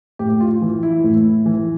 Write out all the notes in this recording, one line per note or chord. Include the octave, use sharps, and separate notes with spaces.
A2 G4
F4
E3
E4
A2
E3